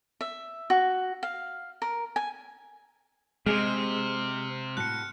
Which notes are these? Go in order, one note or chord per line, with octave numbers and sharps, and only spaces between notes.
E5
F#4
F5
A#4
G#5
C3 G#3 C4 G#4 D#5 F6
A2 F#4 F#6 C#7